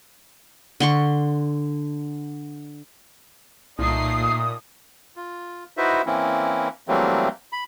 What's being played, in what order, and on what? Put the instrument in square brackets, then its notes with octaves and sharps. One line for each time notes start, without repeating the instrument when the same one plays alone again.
[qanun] D3 C6 C#6
[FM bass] C2 [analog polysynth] A#2 [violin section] A3 D#4 C7 [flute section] D#6
[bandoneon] F4
D#4 E4 F#4 B4 C5 E5
E3 A#3 C4 C#4 E4
E3 F#3 G3 A3 A#3 C4
B5